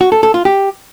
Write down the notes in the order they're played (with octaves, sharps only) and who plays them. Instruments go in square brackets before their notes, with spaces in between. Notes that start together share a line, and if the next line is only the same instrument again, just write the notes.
[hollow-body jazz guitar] F#4
A4
A4
F4
G4